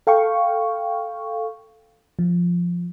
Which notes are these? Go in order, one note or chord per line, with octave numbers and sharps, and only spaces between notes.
A4 F5 G5 C#6
F3